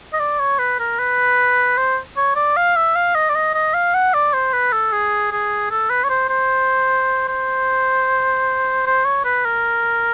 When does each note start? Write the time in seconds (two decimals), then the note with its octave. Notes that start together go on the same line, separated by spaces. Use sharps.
0.13 D#5
0.19 D5
0.39 C#5
0.59 B4
0.79 A#4
0.99 B4
1.77 C5
2.17 C#5
2.36 D5
2.56 F5
2.76 E5
2.95 F5
3.15 D#5
3.29 D5
3.35 D#5
3.54 D#5
3.74 F5
3.94 F#5
4.14 D5
4.33 C5
4.53 B4
4.72 A4
4.92 G#4
5.32 G#4
5.71 A4
5.90 B4
6.04 C#5
6.10 C5
6.29 C5
7.28 C5
8.86 C5
9.05 C#5
9.25 B4
9.45 A#4